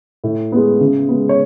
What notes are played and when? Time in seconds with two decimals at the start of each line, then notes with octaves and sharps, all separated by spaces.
0.24 A2
0.52 G#3 B3
0.80 C#3
1.09 G#3 B3
1.29 C#5